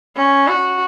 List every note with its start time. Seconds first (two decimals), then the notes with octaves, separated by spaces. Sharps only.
0.17 C#4
0.48 F#4